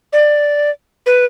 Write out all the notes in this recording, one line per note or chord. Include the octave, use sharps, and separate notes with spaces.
D5
B4